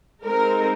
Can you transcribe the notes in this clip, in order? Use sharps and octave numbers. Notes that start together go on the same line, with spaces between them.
G#3 C4 D#4 A#4